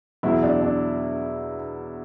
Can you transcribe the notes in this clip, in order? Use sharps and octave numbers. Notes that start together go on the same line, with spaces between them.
E2 B2 F#3 E4
D4
D4